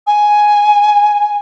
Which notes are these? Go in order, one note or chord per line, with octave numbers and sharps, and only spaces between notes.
G#5